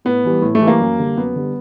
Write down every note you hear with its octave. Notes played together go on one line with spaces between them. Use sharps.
A2 B3
E3 G3
A2
A3
E3 G3
A#3
F#2
D3 G3
F#2 B3
D3 G3